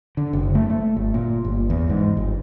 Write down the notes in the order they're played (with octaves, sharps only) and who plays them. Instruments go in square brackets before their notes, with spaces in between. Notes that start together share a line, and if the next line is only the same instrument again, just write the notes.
[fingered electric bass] D3
F#1
A3
A3
G1
A#2
G1
E2
G#2
G1